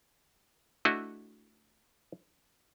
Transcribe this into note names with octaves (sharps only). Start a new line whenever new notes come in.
A3 D4 E4 F#4 D#5